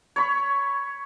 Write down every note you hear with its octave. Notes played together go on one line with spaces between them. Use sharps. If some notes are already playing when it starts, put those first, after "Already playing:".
C#5 B5 C#6